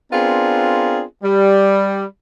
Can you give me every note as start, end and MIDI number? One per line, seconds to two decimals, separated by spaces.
0.12 1.02 59
0.12 1.02 60
0.12 1.02 62
0.12 1.02 65
0.12 1.02 68
0.12 1.02 70
1.23 2.04 55